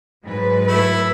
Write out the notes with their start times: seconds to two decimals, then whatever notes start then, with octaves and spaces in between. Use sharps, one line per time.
0.25 G#2 F#3 B4
0.68 A3 E4 B5